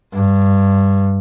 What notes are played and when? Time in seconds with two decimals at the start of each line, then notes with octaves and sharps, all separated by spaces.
0.14 G2